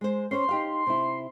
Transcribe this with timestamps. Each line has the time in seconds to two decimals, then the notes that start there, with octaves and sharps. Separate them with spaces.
0.01 G#3 C5
0.31 C#4 C5 C#5 C6
0.49 D#4 G4 F5
0.86 C3 E4